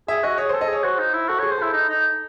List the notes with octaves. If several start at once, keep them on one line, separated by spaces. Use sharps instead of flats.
G#4 E5
F#4 D#5
G#4 C#5
A4 C5
D#5
G#4 C#5
F#4 C5
D#4
E4
F#4 A4
G#4 C#5
C5
E4 A4
D#4
D#4